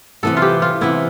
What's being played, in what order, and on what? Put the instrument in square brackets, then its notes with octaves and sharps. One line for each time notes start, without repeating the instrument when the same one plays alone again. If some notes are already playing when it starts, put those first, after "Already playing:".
[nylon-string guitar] C3 E3 B3 [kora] A4
[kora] F4
G4
F4
[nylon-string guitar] C3 E3 B3 [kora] E4